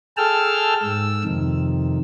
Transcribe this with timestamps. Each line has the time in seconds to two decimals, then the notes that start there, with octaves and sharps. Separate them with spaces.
0.17 G#4 A4 G5 A5 E6 F6
0.83 G#2 E6
1.24 F2 C3 D#3